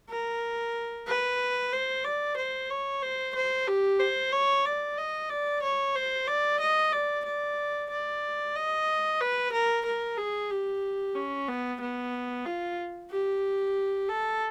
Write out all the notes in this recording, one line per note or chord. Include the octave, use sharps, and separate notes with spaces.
A#4
B4
C5
D5
C5
C#5
C5
C5
G4
C5
C#5
D5
D#5
D5
C#5
C5
D5
D#5
D5
D5
D5
D#5
B4
A#4
A#4
G#4
G4
C#4
B3
B3
F4
G4
A4